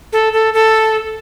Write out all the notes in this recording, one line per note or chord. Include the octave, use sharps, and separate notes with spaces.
A4
A4
A4